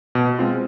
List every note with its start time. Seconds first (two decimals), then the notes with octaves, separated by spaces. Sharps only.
0.15 B2
0.39 G#3 C4 F4